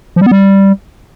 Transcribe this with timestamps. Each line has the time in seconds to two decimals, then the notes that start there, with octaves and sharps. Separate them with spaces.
0.16 F3
0.21 G3
0.26 B3
0.31 G3